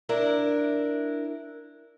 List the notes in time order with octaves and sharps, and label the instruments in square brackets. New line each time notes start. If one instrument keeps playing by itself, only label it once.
[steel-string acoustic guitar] D4 E4 A#4